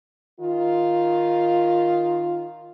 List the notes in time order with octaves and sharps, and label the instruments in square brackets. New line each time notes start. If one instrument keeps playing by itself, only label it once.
[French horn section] D#3 F4